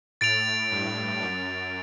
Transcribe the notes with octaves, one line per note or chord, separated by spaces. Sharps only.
A2 A6 D7 F7
G2
F#2